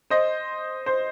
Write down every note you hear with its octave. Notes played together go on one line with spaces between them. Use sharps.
C5 D#5
C5